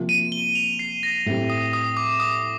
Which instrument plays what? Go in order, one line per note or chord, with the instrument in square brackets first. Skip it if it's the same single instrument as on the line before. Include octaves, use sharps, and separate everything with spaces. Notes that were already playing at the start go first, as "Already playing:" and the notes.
Already playing: [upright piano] C3 F3 A#3 F4
[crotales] D#7
G7
F7
C7
A#6
[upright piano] A2 A3 C4 G4
[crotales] D#6
D#6
D6
D#6